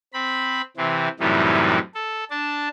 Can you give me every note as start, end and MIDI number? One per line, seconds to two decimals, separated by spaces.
0.13 0.61 60
0.13 0.61 83
0.77 1.08 48
0.77 1.08 52
0.77 1.08 60
1.20 1.78 42
1.20 1.78 45
1.20 1.78 48
1.20 1.78 52
1.20 1.78 55
1.20 1.78 63
1.95 2.24 69
2.30 2.68 62
2.30 2.68 81